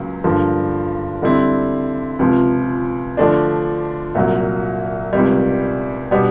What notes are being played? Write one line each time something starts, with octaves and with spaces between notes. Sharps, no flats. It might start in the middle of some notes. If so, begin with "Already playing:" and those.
Already playing: C#2 C#3 F#3 A#3
G2 D3 F3 A#3
D3 G3 C4 E4
C#2 C3 F3
D3 F3 A3 D4
C2 A#2 F#3 A#3
C#2 C3 D#3 G3
B2 G3 B3 D4